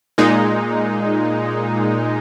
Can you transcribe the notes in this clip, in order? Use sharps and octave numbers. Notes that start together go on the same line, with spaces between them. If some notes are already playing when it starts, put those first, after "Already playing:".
A#2 G#3 D#4